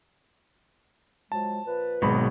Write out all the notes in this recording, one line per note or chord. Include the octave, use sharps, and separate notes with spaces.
F3 F#3 G#3 A5
A#2 F3 B4
G#1 B2 F#3 G#3 B5